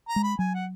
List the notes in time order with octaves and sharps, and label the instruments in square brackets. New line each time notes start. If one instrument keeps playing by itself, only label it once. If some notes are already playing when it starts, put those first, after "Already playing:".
[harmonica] A#5
[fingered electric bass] G#3
[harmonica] B5
[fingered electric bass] F#3 [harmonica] G#5
[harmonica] F#5